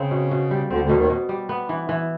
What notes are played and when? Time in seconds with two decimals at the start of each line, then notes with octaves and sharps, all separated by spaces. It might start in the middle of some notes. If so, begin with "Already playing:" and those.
Already playing: C#3 C4
0.11 B2
0.31 B2
0.51 G3
0.70 D2 D3 C4
0.83 D2 D3
0.89 B2
0.96 D#2 D#3
1.10 B2
1.29 G3
1.49 B3
1.69 E3
1.89 E3